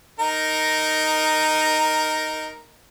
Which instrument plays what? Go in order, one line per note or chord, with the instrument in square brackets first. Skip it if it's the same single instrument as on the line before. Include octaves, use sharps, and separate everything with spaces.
[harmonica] D#4 A#4